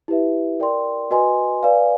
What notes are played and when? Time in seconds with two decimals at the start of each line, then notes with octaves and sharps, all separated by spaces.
0.08 E4 G4 B4 E5
0.60 A#4 D5 G5 C6
1.11 F#4 B4 D#5 G#5 C6
1.63 B4 D5 F5 G#5